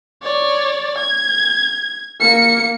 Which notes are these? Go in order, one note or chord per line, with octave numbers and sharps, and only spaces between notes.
C#5 D5
G#6
A#3 C#7